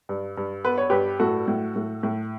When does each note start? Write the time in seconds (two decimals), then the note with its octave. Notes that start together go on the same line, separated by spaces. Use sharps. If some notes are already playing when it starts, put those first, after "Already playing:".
0.09 G2
0.37 G2
0.64 B3 B4
0.78 C#5
0.90 G2 G4 B4
1.19 A2 F#4 A4
1.48 A2
1.76 A2
2.03 A2